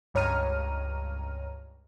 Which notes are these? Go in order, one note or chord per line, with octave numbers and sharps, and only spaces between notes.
C#2 G2 C#5 A#5 F6 D#7